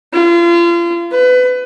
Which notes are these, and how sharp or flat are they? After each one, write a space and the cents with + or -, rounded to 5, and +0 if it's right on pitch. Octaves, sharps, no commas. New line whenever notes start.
F4 -35
B4 +25